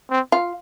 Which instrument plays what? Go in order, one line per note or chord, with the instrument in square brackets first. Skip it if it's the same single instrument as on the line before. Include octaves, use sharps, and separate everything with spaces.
[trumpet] C4
[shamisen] F4